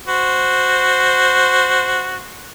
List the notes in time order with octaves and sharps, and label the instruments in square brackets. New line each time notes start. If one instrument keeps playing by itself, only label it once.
[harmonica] F#4 C5